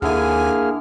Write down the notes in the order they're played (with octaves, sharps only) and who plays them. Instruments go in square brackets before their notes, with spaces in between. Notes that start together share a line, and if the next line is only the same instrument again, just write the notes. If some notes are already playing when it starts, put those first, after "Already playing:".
[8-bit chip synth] D#2 G#5 [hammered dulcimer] D3 E4 [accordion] A#3 G#4 F6